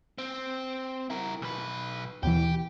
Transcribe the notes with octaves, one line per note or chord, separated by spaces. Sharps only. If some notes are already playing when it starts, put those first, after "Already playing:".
C4
E4 A#4
B1 B4
D#2 B2 E3 G4